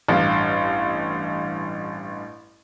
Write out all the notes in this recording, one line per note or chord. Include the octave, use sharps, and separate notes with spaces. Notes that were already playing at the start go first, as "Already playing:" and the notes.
A1 G2 F5